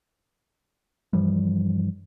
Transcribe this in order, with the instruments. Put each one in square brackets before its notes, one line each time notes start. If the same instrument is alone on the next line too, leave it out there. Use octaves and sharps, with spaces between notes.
[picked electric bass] G2 E3 F3 G3